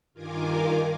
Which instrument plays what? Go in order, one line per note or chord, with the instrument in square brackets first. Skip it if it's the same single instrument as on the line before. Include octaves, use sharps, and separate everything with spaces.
[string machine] G2 D#3 F4 A#4 G#5 D6